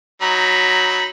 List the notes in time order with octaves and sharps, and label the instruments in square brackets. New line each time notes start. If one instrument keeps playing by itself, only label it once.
[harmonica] F#3 D#4 B5